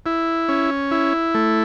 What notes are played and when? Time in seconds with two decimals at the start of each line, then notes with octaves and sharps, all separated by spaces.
0.06 E4
0.49 C#4
0.91 E4
1.35 A3